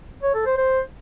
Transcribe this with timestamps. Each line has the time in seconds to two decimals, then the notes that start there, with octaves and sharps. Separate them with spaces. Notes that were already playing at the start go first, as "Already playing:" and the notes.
0.23 C#5
0.34 A4
0.46 C5
0.58 C5